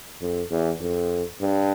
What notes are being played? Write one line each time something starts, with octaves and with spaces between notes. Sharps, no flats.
F2
E2
F2
G2